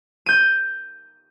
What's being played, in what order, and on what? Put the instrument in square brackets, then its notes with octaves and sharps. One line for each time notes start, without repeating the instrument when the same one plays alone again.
[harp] G6 D#7